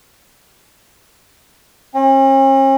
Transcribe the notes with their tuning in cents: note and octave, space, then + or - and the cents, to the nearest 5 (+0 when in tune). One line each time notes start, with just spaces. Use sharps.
C#4 -45